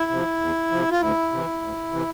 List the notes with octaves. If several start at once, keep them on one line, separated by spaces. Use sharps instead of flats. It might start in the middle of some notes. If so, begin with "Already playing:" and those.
Already playing: E4
C3 F3
E2
C3 F3
F4
D2 E4
C3 E3
D2
C3 E3